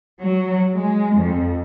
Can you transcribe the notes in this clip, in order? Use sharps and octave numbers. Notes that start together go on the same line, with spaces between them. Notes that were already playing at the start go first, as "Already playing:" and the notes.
F#3
G#3
F2